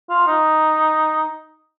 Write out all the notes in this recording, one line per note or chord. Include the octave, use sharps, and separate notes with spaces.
F4
D#4